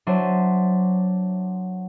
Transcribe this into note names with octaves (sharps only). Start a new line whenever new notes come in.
F#3 D4 C5 E5 C6 D#7